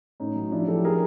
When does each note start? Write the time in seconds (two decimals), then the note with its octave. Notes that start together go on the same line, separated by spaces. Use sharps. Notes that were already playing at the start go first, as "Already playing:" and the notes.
0.20 A2 C#4 D#4
0.36 F#3
0.52 F3 D4 E4
0.68 F3 G4 A4
0.85 G#4 A#4